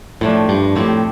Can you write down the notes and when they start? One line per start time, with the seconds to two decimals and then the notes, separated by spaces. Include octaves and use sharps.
0.21 A2 F3 A3 D4
0.49 G2
0.76 A2 F3 C4 G4